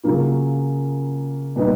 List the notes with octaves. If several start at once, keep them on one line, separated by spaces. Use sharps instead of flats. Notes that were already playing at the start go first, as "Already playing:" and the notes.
C#3 F#3 A#3 C#4 F4
A#2 G3 B3 D#4